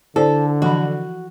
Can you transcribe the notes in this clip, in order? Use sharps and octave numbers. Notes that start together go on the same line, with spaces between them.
D3 E4 A4 C5 D5
E3 F3 F#4 B5